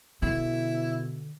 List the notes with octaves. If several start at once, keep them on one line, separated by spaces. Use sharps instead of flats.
B2 D3 E4